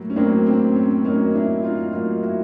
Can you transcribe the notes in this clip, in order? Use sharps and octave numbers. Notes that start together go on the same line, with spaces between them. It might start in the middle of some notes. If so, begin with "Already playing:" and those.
Already playing: A2 F#3 A#3
C#4
A2 F#3 A#3 C4 D4
C4
C#4
A2 F#3 A#3 C#4 D#4
D4 E4
D#4 F4
A2 F#3 A#3 D#4 F4
E4 F#4